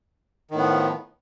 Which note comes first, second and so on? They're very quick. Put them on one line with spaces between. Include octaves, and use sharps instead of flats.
D#3 A2 B3 F3